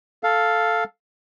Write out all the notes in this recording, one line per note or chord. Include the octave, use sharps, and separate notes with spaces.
A4 F5